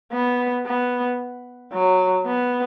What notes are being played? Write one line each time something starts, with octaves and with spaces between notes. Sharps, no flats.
B3
B3
F#3
B3